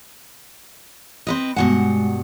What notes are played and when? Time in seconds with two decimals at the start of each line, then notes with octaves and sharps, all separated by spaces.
1.27 C4 B4 D#5
1.56 G2 B2 G#3 F#5